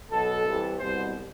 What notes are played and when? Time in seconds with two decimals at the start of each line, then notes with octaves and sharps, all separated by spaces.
0.11 B1 B2 A4
0.45 C2 C3 E3
0.79 C2 B2 C5